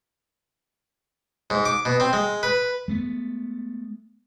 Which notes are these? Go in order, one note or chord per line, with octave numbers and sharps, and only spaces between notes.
G#2
D6
B2
C4
G#3
B4
G#3 A3 B3